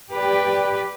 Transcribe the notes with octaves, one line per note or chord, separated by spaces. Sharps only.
G4 B4 D5